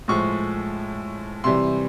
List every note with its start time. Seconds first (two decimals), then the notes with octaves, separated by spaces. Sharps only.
0.08 A2 F3 G#3 C#6
1.44 C3 E3 G3 C6